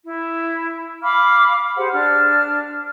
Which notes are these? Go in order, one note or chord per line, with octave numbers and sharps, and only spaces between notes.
E4
F5 B5 D6 F6
G4 G#4 C5 F#5
D4 F6